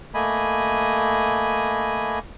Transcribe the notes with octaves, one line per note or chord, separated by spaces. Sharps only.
A3 A#3 D#5 G#5 B5